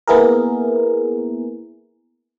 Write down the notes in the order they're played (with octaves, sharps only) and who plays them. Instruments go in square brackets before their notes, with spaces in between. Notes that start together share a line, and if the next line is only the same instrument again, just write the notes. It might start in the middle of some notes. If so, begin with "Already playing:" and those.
[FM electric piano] A#3 B3 E4 G#4 A#4